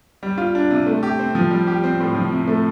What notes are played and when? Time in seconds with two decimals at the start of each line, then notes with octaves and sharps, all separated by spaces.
0.23 G3
0.38 F4
0.55 D4
0.71 C3
0.87 A3
1.03 G4
1.19 C4
1.35 F3
1.51 G3
1.67 G4
1.84 C4
2.00 A2
2.15 F3
2.32 C3
2.47 A3